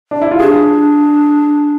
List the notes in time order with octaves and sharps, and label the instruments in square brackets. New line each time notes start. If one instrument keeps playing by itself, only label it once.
[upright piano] D4
E4
F4
[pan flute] D4 [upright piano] G#4